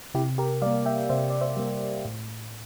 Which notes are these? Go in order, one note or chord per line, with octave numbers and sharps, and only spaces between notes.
C3 E4 G4
G4 A#4
G3 A#3 D5 F5
E5 G5
C3 C5 E5
D5
C5 E5
G3 A#3
A2